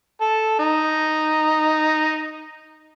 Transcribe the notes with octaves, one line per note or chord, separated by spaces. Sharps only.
A4
D#4